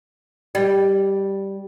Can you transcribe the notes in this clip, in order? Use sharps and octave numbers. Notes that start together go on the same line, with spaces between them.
G3